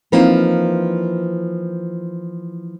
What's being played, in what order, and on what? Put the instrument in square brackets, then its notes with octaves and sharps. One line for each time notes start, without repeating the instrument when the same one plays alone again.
[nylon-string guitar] E3 F3 A#3 C4 D#4